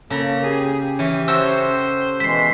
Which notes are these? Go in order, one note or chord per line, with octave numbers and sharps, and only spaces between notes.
C#3 A#3 A4 A#5
G4 G#4
E3 C#4
C#4 F#4 A4 C5 E6
B2 E3 G#3 C5 B6 C7